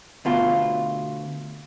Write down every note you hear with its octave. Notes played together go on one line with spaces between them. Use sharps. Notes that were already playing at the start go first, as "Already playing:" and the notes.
D2 B2 F4